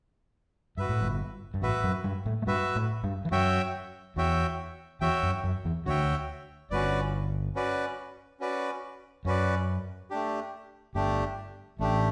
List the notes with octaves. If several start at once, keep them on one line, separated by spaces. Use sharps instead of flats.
G2 F#4 B4 E5
A2
G1 G2
G2
A1 A2 F#4 B4 E5
F#2 F#3
G2 G3
A2 A3
A3
G2 G3 F#4 B4 E5
A2 A3
G2 G3
E3
F#2 F#3 F#4 C#5 E5 G5
E2 E3 F#4 C#5 E5 G5
E2 E3 F#4 C#5 E5 G5
F#2 F#3
F#2 F#3
E2 E3
D2 D3 F#4 C#5 E5 G5
G1 G2 C#4 F#4 B4 D5
C#4 F#4 B4 D5
C#4 F#4 B4 D5
F#2 C#4 F#4 B4 D5
A3 D4 G4
G1 G2 A3 D4 G4
A1 A2 A3 D4 G4